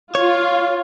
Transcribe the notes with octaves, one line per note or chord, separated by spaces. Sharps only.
F4 C#5